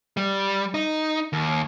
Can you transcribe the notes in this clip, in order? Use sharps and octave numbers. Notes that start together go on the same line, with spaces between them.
G3
D#4
D#2